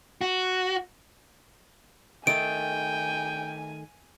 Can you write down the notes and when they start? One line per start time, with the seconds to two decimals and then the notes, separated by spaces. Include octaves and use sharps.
0.21 F#4
2.27 D#3 A3 G5 G#5 D7